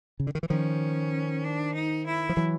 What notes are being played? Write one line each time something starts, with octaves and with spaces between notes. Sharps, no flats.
C#3
D3
D#3
E3
D#3 F3 C#4
D4
D#4
E4
F3
E3 F#3